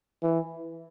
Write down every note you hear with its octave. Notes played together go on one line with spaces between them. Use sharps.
E3